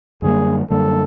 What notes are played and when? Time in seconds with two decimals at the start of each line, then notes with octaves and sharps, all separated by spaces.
0.22 F#2 D3 G3 A#3 G#4
0.70 F#2 D3 G3 A#3 A4